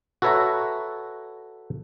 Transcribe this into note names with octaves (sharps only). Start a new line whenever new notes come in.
F#4 A4 B4 C#5 E5 A#5